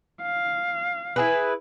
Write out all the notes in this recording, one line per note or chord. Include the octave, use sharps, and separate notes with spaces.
F5
E4 G#4 B4